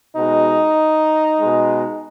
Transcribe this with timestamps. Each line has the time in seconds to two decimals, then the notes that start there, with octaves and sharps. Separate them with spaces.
0.15 B2 G#3 D#4
1.40 B2 G#3